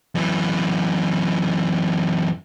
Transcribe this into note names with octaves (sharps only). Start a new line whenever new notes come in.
F#2 E3